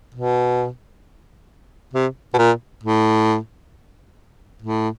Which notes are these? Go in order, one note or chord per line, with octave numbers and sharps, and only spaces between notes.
B2
C3
B2
A#2
A2
A2